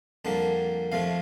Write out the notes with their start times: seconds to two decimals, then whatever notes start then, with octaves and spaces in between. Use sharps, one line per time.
0.25 F2 D3 G3 A#3 A5
0.92 F2 C3 F3 A3 F5